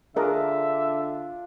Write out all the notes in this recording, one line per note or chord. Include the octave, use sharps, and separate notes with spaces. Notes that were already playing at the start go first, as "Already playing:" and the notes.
D3 D4 F4 G#4 A#4 D#5 E5